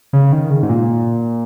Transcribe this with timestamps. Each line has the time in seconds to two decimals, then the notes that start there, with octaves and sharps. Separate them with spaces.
0.13 C#3
0.32 D#3
0.50 C#3
0.63 G#2
0.69 A#2